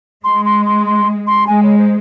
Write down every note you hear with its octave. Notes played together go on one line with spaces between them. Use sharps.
G#3 C6
C6
C6
C6
C6
G#3 G#5
C#5
C5